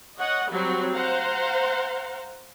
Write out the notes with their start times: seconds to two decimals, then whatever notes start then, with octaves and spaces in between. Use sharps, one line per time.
0.18 C#5 D#5 F#5
0.51 F#3 G3 C4 F#4
0.93 C5 F5 F#5 A#5